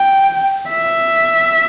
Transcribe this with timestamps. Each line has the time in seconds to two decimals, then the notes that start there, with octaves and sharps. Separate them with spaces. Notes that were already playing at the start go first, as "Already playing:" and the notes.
Already playing: G5
0.70 E5